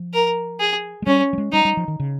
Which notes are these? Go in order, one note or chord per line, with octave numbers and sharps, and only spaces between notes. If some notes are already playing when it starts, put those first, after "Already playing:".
Already playing: F3
A#4
G#4
G#3
G3 C#4
G3
G#3
G3 D#4
G3
F3
D#3
C#3